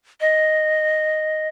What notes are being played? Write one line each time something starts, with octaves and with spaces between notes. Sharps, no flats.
D#5